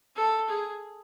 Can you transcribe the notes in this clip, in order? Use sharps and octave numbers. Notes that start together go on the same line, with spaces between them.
A4
G#4